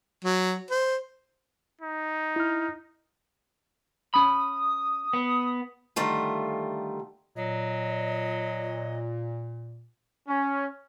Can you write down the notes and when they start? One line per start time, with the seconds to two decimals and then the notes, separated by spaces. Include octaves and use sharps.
0.24 F#3
0.70 C5
1.82 D#4
2.36 E4 F6
4.14 C#4 B5 D#6
5.13 B3
5.96 D3 D#3 G3 A3 F4
7.36 A#2 F#3 D#5
10.28 C#4